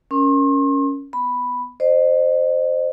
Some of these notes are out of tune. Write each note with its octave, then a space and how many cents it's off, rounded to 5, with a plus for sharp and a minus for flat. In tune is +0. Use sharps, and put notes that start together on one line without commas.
C#4 +10 A#4 +10 C6 +40
B3 +0 B5 +0
C5 +0 D#5 -35